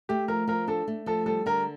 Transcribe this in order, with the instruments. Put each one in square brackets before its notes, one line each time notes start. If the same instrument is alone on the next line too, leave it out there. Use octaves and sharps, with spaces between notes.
[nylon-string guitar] A3 [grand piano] G4
[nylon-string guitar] F3 [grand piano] A#4
[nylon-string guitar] F3 [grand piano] A#4
[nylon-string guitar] D4 [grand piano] A4
[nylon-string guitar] A3
[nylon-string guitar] F3 [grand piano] A4
[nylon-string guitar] G3 [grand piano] A4
[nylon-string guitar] D3 [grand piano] A#4